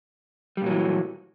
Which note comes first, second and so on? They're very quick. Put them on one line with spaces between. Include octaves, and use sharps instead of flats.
G3 A#2 F#3 E3